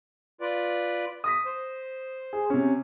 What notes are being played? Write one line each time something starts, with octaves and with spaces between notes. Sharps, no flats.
F4 B4 D5
D#6 A#6 B6
C5
G#4
C3 C#4